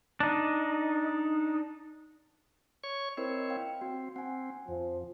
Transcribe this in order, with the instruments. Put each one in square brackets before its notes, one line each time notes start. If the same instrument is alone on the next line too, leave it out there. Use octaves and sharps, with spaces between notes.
[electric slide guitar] D4 D#4
[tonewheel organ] C#5 C#6
[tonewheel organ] C4 E4 C#5 [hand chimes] A#4 C5 D#5
[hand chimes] F5 G5
[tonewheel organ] C4 [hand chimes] F#4
[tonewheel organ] C4 [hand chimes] F#5 G#5
[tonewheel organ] F2 [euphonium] F3